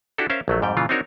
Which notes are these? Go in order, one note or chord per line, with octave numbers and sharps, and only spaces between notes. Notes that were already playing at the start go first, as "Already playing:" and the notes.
D4 E4 F#4 G4 A4
C#4 A#4 C5 E5 F5
A#1 F#3 A3
F2 G#2 G3 G5
A#2 C#3 E3 F4
C4 D4 D#4 F#4 A#4 C#5